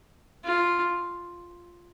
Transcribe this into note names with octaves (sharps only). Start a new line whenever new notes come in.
F4